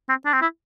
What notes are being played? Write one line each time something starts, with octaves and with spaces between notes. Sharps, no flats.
C4
D4
C4
E4